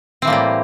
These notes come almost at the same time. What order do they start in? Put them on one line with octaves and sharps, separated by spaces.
C4 E3 A#3 A2 G3